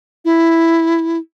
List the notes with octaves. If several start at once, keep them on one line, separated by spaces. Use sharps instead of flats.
E4